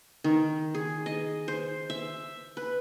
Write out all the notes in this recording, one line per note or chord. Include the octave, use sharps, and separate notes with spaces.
D#3
G#4
D#5
C5
E5
B4